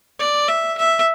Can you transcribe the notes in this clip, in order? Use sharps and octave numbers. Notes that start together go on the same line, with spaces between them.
D5
E5
E5